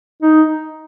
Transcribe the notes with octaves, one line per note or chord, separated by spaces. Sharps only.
D#4